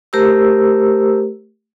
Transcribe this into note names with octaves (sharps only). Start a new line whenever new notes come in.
A3 G4 A#4 C5 A#5 E6